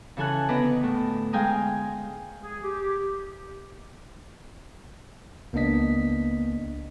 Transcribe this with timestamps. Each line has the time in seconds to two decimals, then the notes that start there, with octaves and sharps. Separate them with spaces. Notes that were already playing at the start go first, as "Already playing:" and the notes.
0.17 C#3 E3 A4 G#5 F#6
0.49 D3 B3 B4 D#5 A#5 D6
0.83 A2
1.33 G#3 F5 G5 G#5 A#5 D#6
2.42 G#4
2.63 G4
5.53 C#2 A#3 B3 D4 D#5 B6